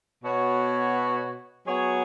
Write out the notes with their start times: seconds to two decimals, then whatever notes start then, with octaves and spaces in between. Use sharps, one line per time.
0.23 B2 B3 F#4 C#5
1.66 F#3 B3 G#4 C#5